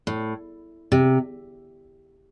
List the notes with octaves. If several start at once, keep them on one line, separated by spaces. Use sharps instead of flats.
A2
C3